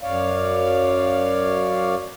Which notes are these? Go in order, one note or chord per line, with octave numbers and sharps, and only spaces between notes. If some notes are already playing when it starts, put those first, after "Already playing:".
F#2 C#5 D5 F5